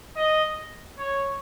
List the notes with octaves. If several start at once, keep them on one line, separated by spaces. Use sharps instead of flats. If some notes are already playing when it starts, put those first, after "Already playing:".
D#5
C#5